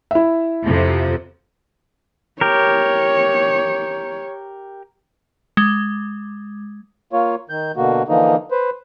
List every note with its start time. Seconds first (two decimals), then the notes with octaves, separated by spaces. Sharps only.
0.11 E4 E5
0.65 F2 C3 F3
2.41 G4 A#4 C#5
5.57 G#3
7.13 A#3 F4 C#5
7.50 D#3 G6
7.76 B2 D3 A#3 F#4
8.08 D3 E3 F3 A#3 D#4
8.51 B4 C5